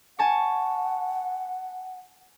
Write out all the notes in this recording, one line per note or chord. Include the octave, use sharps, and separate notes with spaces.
F#5 G#5 A5 C#6